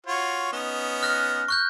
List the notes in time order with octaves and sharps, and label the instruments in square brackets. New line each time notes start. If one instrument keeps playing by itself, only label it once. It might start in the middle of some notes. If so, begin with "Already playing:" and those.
[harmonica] F4 F#4 C#5
B3 C#4 D#4
[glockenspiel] F6 F#6 A#6
C#6 F#6 G6